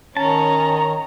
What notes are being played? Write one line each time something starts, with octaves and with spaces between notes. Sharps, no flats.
D#3 C#4 A5 A#5